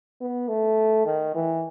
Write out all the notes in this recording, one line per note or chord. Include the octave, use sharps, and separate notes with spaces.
B3
A3
D#3
E3